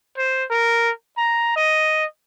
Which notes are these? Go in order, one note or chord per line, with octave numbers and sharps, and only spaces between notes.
C5
A#4
A#5
D#5